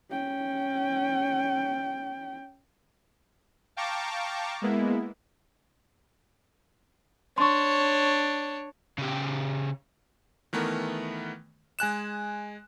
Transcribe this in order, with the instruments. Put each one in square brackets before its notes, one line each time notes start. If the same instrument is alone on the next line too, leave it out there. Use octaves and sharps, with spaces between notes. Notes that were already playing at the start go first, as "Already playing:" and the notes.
[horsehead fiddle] C#4 G5
[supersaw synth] F5 G5 A5 A#5 C#6 D6
G#3 A#3 B3 E4
[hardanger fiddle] D4 C#5 [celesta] C6 C#6
[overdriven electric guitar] C#3 G4
[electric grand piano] D#3 E3 A3 B3 A#4
G#3 G#5 F#6 E7